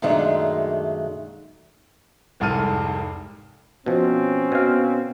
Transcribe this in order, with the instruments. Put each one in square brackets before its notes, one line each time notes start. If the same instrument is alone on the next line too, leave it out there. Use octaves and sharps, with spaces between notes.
[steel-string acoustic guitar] F#2 A#2 D#3 G#3 A3 D4
[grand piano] F1 C2 G#2 A4 F6 D#7
[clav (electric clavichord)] B2 F3 [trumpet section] C4 C#4
[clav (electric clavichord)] B2 F5